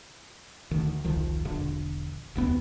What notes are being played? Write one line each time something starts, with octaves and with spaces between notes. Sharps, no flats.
D2 D#3
E1 C2 D#3 F3
E1 A#1 D3
F1 D#2 B3 C4